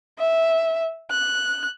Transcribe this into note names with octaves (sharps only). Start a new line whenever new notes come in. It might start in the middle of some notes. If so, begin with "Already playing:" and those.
E5
F#6